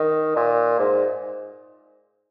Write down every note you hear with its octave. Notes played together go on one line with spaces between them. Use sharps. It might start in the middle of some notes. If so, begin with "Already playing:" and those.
Already playing: D#3
A#2
G#2